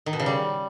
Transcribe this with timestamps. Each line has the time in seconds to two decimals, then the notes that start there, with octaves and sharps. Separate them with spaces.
0.06 D#3
0.13 B2
0.20 C#3
0.26 G3